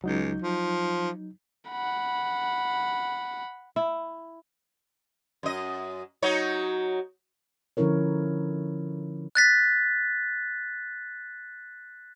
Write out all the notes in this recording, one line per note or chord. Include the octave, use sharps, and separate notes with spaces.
C#2 F#3 D#4 G6
F3
F#5 B5
E4
F#2 D#5
F#3 D#4 C#5
D3 F3 C#4 E4 A#4 C#5
F#6 A6 B6